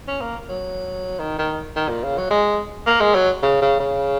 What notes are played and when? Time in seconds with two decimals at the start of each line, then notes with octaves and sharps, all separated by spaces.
0.08 C#4
0.21 A#3
0.49 F#3
1.19 D#3
1.38 D#3
1.76 D#3
1.89 A#2
2.04 C#3
2.18 F#3
2.30 G#3
2.86 A#3
3.00 G#3
3.15 F#3
3.42 C#3
3.62 C#3
3.80 C#3